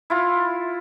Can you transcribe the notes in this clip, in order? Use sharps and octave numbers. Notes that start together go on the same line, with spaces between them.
E4 F4